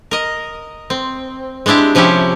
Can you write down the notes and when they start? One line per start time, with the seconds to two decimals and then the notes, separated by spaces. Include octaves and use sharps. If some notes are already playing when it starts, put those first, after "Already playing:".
0.11 A#4 D#5
0.90 C4
1.66 G#3 C4 D4 E4 G4
1.95 C3 F3 C#4 E4 G4